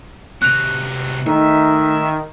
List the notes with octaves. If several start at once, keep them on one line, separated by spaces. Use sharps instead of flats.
C3 F#4 F#6 F7
D#3 A3 D#4 E5